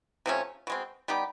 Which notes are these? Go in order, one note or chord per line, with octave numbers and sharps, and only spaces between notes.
C3 F3 A3 C#4
B2 G#3 C4
G3 B3 D#4 G4